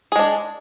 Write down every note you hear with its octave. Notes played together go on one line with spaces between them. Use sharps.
G#3 D4 G#4